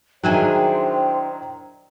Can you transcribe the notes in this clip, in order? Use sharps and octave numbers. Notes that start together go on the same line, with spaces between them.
D#3 F#3 D4 E4 G#4 C5 G5